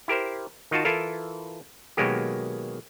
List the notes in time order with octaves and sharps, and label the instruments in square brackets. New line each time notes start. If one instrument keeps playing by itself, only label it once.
[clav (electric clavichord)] E4 G4 A#4 C5
D#3 D#4 F4 F#4 A5
E3 E4 F4 A4 A#4
B2 D#3 F#3 G#3 A#3 G4